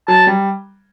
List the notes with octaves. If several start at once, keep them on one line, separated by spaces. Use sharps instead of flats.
F#3 A5
G3